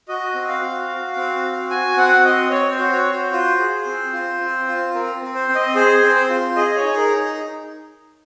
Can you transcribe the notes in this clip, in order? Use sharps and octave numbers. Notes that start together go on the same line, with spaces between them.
F#4 D#5
C4
F5
F#4
F#4
C4
F#4
F#4 G#5
C4 F#5
C4 D#5
C4 C#5
C5
F#4
C#5
F#4
C5
F4 C5
G#4
C4
F4
C4
F4
C4 A#4
C4
C5
C4
D#5
G#4 C5
C4
C5
F4
G#4 D#5
D#5
C#5
D#4
A#4